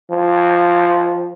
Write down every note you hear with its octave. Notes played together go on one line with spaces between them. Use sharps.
F3